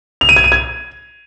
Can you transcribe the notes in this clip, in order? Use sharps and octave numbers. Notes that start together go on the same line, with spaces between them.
F7
D#7
G#6
D#7
G#6